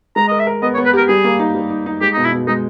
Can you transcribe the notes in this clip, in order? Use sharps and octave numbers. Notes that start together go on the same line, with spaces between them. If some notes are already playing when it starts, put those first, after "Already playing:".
G#3 A#5
A#4 D#5
E5
A#4
B3 D#5
C#5
B3
B4
G4 A#4
G3 G#4
A#3
D#4
G3
D#4
D#4
G#3 G4
B2 D#4
E4
B2
G#3 D#4